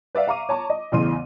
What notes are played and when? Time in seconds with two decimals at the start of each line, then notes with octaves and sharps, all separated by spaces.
0.15 B4 D5 E5 F5
0.27 E5 F5 A#5 C#6 D6 D#7
0.49 C#5 A5 A#5 C#6
0.70 D#5
0.92 A1 E2 C#3 E3 C6 D#7